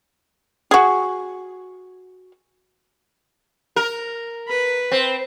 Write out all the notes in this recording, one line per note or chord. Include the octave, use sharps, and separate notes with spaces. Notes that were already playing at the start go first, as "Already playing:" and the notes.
F#4 G#4
A#4
B4 B5
C4